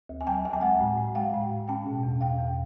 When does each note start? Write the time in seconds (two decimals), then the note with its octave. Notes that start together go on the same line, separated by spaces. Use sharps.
0.09 D2
0.21 G#5
0.27 F#3 G5 A5
0.45 D2 G#5
0.53 A5
0.61 G#3 F#5 G#5
0.80 A2
0.98 A2
1.15 G#3 F5 G5
1.34 A2
1.51 A2
1.68 C#4 G5 A5
1.86 B2
2.03 E2
2.21 E2 F5 G5
2.39 E2